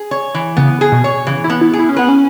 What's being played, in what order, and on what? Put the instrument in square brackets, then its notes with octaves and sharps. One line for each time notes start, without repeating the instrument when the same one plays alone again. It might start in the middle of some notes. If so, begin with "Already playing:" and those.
Already playing: [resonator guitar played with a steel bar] G#4
C#5
E3
[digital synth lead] C#3 [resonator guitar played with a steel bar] B3
[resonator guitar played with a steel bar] G#4
[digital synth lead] B2
[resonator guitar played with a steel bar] C#5
[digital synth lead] C#3 [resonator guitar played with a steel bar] E3
[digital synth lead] E4
[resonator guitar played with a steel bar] B3
[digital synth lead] E4
[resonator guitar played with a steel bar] G#4
[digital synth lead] E4
C#4
[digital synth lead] B3 [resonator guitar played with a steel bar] B4
[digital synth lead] C#4